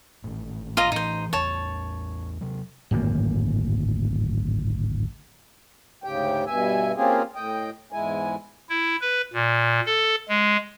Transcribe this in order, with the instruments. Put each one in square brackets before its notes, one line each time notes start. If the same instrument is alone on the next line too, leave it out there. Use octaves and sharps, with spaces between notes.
[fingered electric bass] G#1 A2
[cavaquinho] F4 D#5 A#5
[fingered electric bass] A2 E3 [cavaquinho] D#4 C5
[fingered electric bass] A1 E2 [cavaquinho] C#5 A5
[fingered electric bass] C3 F#3
[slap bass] D1 G#1 F#2 A#3
[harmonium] D2 G#2 C#3 G4 G5
G2 B2 E5 G#5
A#3 C4 C#4 F4 G4 G#4
A2 D#5 G5
E2 G#2 G#3 E4 G#5
[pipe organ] E4
B4
A#2
A4
G#3